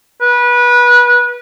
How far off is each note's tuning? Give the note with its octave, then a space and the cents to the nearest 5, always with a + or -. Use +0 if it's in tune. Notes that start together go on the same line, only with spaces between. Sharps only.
B4 -25